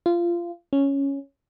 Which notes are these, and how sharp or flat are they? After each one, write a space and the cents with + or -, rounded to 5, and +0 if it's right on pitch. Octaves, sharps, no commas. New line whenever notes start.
F4 -20
C#4 +0